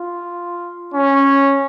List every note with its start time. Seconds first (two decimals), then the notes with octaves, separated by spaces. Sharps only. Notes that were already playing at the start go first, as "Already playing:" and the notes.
Already playing: F4
0.94 C#4